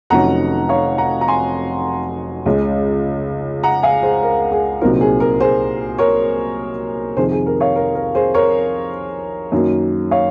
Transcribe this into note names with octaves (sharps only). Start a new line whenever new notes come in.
F1 F2 D#3 F#3 C#4 F#5 A#5
C#5 F5
F#5 A#5
A#5
G#5 C6
C#2 C#3 G#3
F#5 A#5
F5 G#5
G#4 C5
A#4
G#4
C2 A#2 F#3 C4 D#4 A#4
G#4
A#4
G#4 C5
A#4 C#5
F2 C3 D#3 G#4 C5
G#4
A#4
C#5 F5
A#4
A#4
G#4 C5
A#4 C#5
F#2 D#3 F#3 A#3
C#5 F5